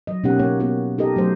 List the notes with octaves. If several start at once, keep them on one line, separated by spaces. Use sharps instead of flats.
F#3 D#5
B2 A#3 C#4 D#4 G4 F#5
A#3 C#5 F#5
A#3 B3 F#4
D#4 G4 A4 A#4 D#5
F#3 A3 C5